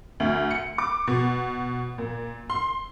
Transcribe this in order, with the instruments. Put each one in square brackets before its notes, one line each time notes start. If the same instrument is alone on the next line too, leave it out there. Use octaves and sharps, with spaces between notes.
[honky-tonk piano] D2
C#7
D6
B2
A#2
C6